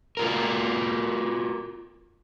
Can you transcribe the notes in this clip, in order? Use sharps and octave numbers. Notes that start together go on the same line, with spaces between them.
F4 F#4 A#4